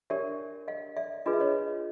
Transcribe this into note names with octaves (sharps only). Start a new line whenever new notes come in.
D4 G4 A#4 C#5 D5 E5
D#5 F5
D5 E5
D4 F4 G#4 B4 D#5
E5
C#5 D#5